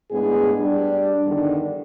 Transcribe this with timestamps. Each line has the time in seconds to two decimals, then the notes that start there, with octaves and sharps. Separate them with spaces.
0.11 A2 G#3 B3 D4 G#4
0.60 G3 D4
1.26 E2 G2 D3 D#3 D4